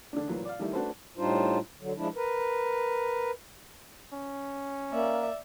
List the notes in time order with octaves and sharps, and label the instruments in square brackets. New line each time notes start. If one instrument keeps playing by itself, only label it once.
[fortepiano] D3 D4
A#2 E3 F#3
D5 F5
D#3 G3 A3 E4
A3 D4 F#4 A4 B4 C5
[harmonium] A2 G3 D4 D#4 F4 C5
D3 F#3
F3 G#3 D4 E4
A#4 B4
[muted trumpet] C#4
[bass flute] A#3 [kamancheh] D5 E5